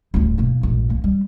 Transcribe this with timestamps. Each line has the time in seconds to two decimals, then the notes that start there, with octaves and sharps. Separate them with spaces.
0.14 D1 G1
0.38 B1 A#3
0.63 A#1 G#2
0.90 A#3
1.04 G3